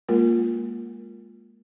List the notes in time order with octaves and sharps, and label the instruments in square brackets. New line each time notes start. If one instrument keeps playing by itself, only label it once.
[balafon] G#3 A#3 F4 A#4